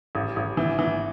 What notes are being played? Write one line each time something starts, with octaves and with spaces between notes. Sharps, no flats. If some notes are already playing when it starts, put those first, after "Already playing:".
A1
A1
E3
E3